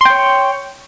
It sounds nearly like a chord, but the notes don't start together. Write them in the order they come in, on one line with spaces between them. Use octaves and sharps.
C6 G5 C#5